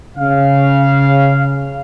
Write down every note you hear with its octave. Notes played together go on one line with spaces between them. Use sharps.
C#3 F5